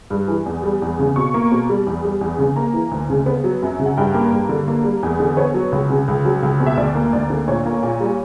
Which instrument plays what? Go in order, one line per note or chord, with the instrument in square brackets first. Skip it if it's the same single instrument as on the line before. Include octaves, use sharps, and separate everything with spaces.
[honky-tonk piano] G2
E3
E2
G3
E2
C#3
B2 C#6
A#3
B2
G3
E2
G3
E2
C#3
A#3 A#5
E3
D2
C#3
B3
F#3
F#2
C#3
F#5
G2 G5
A#3
G2
D3
A#3
G3
E2
D3
B3 C#5
F#3
C#2
C#3
C#2
F#3
C#2
B2
E5
D2 D5
A#3
D2 D5
D3
A#2 C#5
A#3
A#2
G3